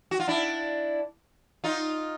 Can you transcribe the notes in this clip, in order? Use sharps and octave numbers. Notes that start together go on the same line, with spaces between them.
F#4
F4
D4 E4
D#4 F4